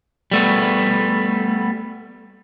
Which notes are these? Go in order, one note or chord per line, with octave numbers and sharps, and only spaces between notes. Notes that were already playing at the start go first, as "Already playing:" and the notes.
G3 A3 B3